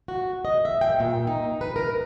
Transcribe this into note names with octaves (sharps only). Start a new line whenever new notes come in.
F#4
D#5
E5
G5
A#2
D#4
B4
A#4